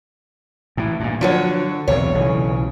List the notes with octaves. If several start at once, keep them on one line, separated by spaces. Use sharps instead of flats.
A2 E3
G2 A#2
D3 F3 F#3 C#5
B1 E2 C3 C#5
B1 C#3 E3